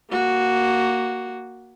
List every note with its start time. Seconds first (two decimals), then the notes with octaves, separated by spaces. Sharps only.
0.11 A#3 F#4